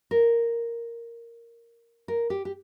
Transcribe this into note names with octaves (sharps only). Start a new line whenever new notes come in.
A#4
A#4
G4
G4